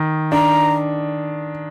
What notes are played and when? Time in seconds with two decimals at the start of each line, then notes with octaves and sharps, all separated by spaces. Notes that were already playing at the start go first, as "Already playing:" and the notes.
Already playing: D#3
0.32 D4 A#5